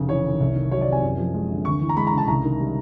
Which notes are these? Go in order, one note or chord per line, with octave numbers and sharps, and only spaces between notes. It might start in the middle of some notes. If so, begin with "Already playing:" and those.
Already playing: F1 C#3
E3 C#5
D#2
C2
D#3
F#3 C#5
D5
C3
G#5
F#2
F3
G#3
D3
D2 C#6
E3
A#5
G#3 B5
A#5
C#3 A5
C2 A#5
D#3
G3